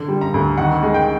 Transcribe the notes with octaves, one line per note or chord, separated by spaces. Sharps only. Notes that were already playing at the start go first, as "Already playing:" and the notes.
Already playing: D3
G3
A#5
D2
D#3 F#5
G#3
G5